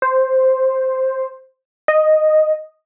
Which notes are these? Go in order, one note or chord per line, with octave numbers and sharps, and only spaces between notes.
C5
D#5